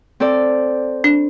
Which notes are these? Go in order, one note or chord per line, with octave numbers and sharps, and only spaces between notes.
C4 A4 D5
D4